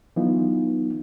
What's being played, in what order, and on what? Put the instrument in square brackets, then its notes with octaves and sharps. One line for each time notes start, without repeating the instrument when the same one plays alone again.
[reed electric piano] E3 F#3 B3 D#4 F4